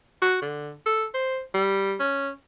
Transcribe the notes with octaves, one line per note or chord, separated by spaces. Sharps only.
F#4
D3
A4
C5
G3
C#4